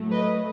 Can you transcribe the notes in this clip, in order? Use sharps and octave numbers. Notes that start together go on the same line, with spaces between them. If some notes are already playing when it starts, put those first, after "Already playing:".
Already playing: A2 F#3 A3
B4 D#5